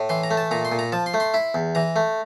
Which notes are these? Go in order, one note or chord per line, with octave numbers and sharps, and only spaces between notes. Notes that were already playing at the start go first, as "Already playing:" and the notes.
Already playing: A2
E3 C6
A#5
A3
A5
A#2 A#5
C6
A#2
A#5
F3 A5
C6
A3
C6
E4
E2
E3 A#5
A3